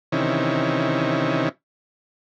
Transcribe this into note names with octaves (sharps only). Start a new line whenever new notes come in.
C3 D#3 E3 C#4